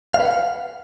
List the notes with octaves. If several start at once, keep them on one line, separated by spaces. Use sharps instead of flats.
F5
B4
F#5
F5